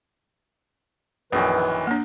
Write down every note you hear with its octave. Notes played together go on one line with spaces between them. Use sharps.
A#1 F#2 D#3 E3 B4
A#3 D4